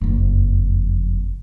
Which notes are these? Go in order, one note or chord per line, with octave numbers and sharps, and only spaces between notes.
F#1 F2